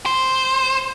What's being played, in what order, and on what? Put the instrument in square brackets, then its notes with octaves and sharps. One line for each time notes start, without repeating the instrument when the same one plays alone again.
[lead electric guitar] C5